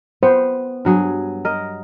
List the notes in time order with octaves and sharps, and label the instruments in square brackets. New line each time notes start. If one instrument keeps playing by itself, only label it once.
[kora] B3 [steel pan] C5
[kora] G2 F#3 G#4
A#4 D#5